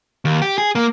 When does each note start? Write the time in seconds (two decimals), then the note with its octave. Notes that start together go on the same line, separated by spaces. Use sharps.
0.25 D#2
0.42 G4
0.58 G#4
0.75 A#3